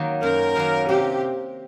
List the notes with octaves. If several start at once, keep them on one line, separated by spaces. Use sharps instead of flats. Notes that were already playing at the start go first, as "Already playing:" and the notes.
Already playing: D#3 F#3 A#3
F#2 A#4
D#3 F#3 A#3
C3 G4